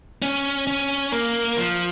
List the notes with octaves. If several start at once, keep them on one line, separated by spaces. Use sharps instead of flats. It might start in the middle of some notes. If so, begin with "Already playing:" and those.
C#4
C#4
A#3
F3